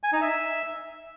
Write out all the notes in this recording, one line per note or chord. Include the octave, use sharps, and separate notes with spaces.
G#5
D#4
E5